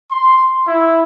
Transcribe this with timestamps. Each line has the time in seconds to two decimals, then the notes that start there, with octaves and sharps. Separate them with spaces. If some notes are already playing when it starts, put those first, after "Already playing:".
0.11 C6
0.67 E4